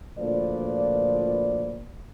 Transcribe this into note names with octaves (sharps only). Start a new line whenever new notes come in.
D2 A#2 F3 B4 D5